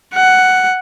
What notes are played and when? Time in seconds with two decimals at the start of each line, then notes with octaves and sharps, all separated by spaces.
0.14 F#5